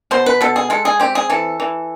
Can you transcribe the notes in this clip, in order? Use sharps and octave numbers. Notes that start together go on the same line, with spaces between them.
B2 C5
B4
B2 A4
G#4
G#3 A4
G#4
C4 G4
G#4
E3 A4
E3